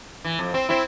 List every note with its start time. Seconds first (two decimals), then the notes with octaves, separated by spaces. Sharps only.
0.25 E3
0.39 F2
0.54 C4
0.69 C4 E4